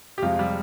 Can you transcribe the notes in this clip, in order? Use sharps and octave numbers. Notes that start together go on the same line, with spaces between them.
G4
F2 C3 F3 G#3 F4
G3